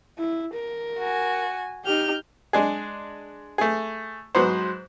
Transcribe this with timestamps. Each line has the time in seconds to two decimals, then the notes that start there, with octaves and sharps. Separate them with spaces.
0.18 E4
0.54 A#4
0.99 F#4 G#5
1.85 D#4 G4 F6 G6
2.53 G#3 D4 G#4
3.58 A3 G#4
4.35 G#2 F#3 B3 C5